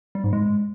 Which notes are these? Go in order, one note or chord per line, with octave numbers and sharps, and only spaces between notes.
G3
G#2
G#3